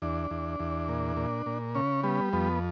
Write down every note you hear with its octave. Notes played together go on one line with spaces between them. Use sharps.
E2 D4
E2
E2
A#2
A#2
A#2
C#3 C#4
G3 B3
F2 B3